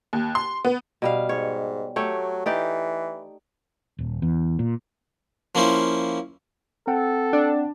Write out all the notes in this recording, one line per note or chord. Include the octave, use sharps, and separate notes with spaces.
D#2
C6
B3
B2 G3 F5
G#2 C#5
F#3 A3 G4 C#5
E3 D#4 G4 D5
D#1
E2
A#2
F3 A#3 C#4 E4 C5
C4 A4 F#5 G5
D4